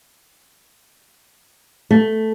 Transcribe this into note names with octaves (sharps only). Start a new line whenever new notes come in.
A3